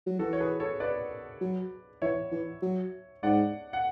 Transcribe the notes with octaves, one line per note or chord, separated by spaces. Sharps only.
F#3
E3 F#4 A4
C#5
G#4 B4
A4 C#5
B4 D5
F#3
E3 C#5 E5
E3
F#3
G#2 D5 F#5
F#5